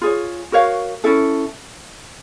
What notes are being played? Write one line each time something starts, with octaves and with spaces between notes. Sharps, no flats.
F4 G#4 C#5
F#4 A#4 C#5 F5
C#4 E4 A4